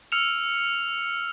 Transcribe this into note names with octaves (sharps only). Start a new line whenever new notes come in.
E6 F6 C#7 E7 F7